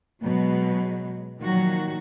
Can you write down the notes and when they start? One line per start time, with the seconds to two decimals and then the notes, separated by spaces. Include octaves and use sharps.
0.22 B2 F#3 G#3
1.41 A#2 D#3 F3 F#3 F#4